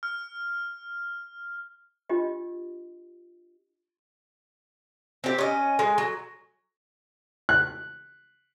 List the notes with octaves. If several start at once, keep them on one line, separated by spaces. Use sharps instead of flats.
F6
D4 F4 G4 D#5
C4 G4
C#4 D#5
G#3
F#3
F#6